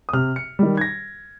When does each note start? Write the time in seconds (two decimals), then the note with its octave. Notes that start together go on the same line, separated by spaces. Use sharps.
0.09 D#6
0.13 C3 F6
0.36 C#7
0.59 D#3 G3
0.77 G#6
0.81 A#6